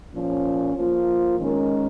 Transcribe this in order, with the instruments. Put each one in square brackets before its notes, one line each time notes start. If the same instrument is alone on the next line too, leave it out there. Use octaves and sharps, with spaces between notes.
[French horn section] A#2 F3 C#4
F3 A#3 F4
D#3 G#3 C#4 A#4